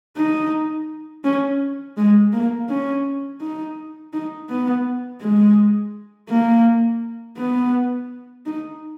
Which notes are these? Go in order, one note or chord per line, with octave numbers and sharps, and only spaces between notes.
D#4
C#4
G#3
A#3
C#4
D#4
D#4
B3
G#3
A#3
B3
D#4